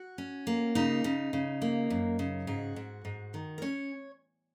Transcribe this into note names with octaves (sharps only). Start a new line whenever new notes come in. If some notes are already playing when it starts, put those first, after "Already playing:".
Already playing: F#4
C#4
A#3
C#3 D#4
C#3
C#3
A#3
F#2
C#3
G#2 F#4
G#2
G#2
D#3
A#4
C#4 C#5